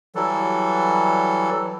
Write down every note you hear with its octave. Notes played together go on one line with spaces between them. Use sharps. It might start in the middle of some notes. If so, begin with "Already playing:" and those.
E3 F#3 G3 A4